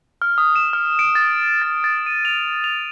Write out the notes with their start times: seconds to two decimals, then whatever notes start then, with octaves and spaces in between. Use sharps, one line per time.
0.22 F6
0.38 D#6
0.56 E7
0.73 F6
0.99 D7
1.15 A6
1.62 A6
1.84 A6
2.06 D#7
2.25 F7
2.64 F7